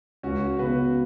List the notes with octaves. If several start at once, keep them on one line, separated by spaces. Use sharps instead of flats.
C#2 C#4 F#4
C#3 B3 F#4 B4